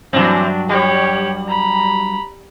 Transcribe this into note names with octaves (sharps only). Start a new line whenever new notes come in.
G2 E3 F#3 C4 D4
G3 G4 C#5
A#5 B5